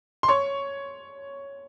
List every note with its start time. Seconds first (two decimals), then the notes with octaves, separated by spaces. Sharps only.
0.23 C6
0.29 C#5 C#6